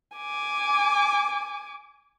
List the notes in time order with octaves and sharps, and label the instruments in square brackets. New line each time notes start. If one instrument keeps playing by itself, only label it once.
[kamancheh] G#5 D6